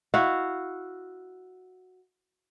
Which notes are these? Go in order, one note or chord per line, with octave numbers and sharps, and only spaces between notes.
E4 F#4 F5